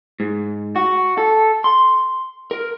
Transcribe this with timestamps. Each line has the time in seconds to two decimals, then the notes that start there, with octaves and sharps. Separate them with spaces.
0.20 G#2
0.76 F#4
1.18 A4
1.64 C6
2.51 A#4